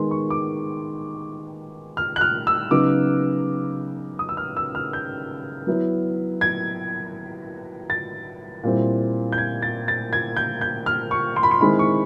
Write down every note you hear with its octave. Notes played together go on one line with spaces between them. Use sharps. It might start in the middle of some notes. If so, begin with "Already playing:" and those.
Already playing: D#3 G#3 B3 C6
C#6
D6
F6
F#6
F6
E6
C#3 F#3 B3 D#4 D6
D#6
E6
F6
E6
F6
G6
F#3 B3 E4
G#6
A6
A#2 G3 C4 E4
G6
G#6
A6
A6
G#6
G6
G6
F6
C#6
C6
B5
C6
D#3 G#3 C4 E4 B5
C#6